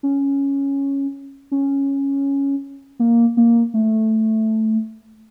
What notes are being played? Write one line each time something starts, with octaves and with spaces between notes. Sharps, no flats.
C#4
C#4
A#3
A#3
A3